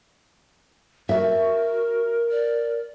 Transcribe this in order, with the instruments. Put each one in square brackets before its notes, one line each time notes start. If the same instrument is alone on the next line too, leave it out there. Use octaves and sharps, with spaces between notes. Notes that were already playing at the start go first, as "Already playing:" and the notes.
[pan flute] F#4 [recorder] A#4 [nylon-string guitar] E5
[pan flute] D5